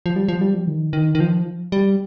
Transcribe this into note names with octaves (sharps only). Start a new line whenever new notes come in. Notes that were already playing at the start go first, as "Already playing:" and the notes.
F3
G3
F3
G3
F3
D#3
D#3
D#3
F3
G3